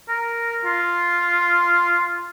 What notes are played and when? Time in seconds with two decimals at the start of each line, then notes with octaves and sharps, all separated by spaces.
0.09 A#4
0.65 F4